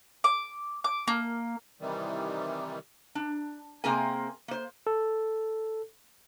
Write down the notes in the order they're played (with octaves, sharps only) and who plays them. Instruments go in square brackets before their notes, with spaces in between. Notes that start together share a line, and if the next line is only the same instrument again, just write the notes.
[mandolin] D6
D6
A#3
[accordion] C3 D#3 E3 G3
[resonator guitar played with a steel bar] D4
C3 A#3 C4 G#4 A#4 G#5
A#3 C5
[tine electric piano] A4